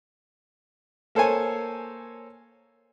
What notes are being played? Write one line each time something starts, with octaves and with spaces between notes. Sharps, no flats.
A#3 A4 C5 C#5 G#5